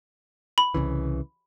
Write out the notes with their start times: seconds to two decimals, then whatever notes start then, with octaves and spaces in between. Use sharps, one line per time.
0.58 B5
0.74 C2 C#3 E3